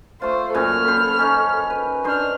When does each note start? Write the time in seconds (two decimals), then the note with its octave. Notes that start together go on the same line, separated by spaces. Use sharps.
0.22 A3 F4 C5
0.54 F#2 A#2 A4 G#5 F6
0.85 C5 B5
1.19 C#4 D#4
1.70 B4
2.05 D4 D#4 C5 F6